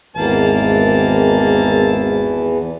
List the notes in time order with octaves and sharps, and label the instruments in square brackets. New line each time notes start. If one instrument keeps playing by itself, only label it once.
[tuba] G#1 [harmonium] E2 E3 [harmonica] A#3 A5